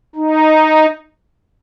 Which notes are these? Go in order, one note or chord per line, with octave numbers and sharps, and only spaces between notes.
D#4